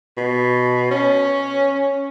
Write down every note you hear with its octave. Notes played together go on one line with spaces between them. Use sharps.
B2
C#4